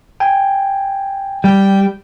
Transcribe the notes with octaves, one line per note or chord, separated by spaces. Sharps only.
G5 G#5
G3 G5